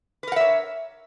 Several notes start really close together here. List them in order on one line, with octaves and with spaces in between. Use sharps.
B4 A#4 F#5 E5 C#5